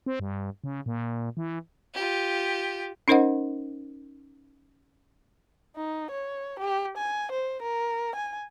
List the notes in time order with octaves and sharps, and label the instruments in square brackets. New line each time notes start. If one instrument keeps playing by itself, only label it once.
[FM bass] C4
G2
C#3
A#2
E3
[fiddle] F4 G4
[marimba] C#4 D#4 A#4 C5 D#5 F#5
[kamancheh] D#4
C#5
G4
G#5
C5
A#4
G#5